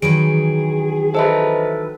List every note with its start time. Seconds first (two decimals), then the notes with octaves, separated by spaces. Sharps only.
0.02 D#3 E3 F#3 G#4 D7
1.15 A4 B4 C5 D#5 E5